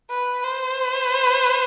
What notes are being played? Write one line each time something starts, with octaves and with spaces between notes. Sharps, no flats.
B4
C5